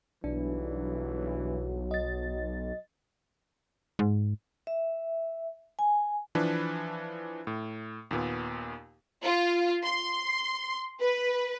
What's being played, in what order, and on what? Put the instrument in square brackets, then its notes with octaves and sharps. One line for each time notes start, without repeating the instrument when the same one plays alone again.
[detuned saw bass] B1 [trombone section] G2 E3 [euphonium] F#3 [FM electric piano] D4
[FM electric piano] D#5 A6
[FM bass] G#2
[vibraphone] E5
G#5
[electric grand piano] E3 F3 D4 B4
A2
D#2 A#2 B3
[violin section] F4
C6
B4